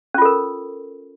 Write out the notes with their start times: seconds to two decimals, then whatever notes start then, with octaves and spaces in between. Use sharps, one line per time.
0.14 C#4
0.18 F4
0.22 A4
0.25 A#4